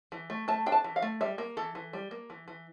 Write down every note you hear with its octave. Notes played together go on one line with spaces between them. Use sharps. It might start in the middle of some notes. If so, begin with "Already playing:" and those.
E3
A3
A3 A5
D4 G5
A5
E3
F5
A3
G3 E5
A#3
E3 A4
E3
G3
A#3
E3
E3